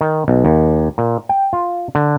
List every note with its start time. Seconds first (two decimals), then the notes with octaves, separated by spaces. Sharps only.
0.01 D#3
0.28 B1
0.45 D#2
0.98 A#2
1.29 G5
1.53 F4
1.95 D3